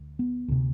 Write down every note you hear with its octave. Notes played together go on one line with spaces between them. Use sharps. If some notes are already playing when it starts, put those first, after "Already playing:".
Already playing: D2
B3
D2 C3